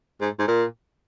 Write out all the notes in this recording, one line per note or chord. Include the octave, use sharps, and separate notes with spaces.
G#2
G#2
A#2